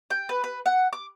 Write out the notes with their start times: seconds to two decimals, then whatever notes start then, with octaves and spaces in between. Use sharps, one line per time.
0.10 G5
0.29 B4
0.44 B4
0.66 F#5
0.93 D6